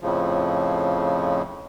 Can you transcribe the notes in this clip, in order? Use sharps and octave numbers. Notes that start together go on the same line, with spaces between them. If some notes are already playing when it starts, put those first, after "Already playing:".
F2 A2 C#3 F3